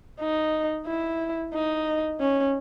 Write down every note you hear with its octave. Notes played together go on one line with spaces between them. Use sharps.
D#4
E4
D#4
C#4